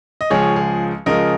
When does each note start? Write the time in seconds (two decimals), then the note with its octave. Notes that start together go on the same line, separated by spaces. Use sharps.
0.21 D#5
0.30 C#2 C#3 F3 G#3 G#4 C#5
0.56 G#4
1.06 C#2 C#3 F3 G#3 A#4 D#5